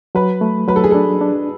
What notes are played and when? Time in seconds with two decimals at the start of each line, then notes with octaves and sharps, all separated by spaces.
0.15 F#3 B4
0.41 A3
0.68 F#3 B4
0.76 A4
0.84 G#4
0.91 D4 A4
1.21 D4